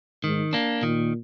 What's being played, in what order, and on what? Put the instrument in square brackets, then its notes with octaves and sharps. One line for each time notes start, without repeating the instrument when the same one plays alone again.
[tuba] G#2 [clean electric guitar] D#3
[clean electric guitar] A#3 D4
[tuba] A#2 [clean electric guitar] D#3